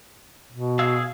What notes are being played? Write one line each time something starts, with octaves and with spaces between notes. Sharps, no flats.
B2
G#4 F5 E6